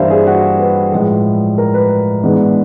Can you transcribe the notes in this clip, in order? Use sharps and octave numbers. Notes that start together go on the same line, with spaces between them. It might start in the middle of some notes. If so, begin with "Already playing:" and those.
Already playing: G2 E3 G3 A#3 C5 E5 F5
G#4
F#4
B4
A2 F3 G#3
A#4
B4
G#2 E3 G#3 B3 D4